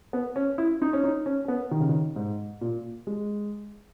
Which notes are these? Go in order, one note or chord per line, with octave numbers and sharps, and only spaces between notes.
B3
C#4
E4
D#4
C#4
D#4
C#4
C#4
B3
D#3
C#3
D#3
G#2
A#2
G#3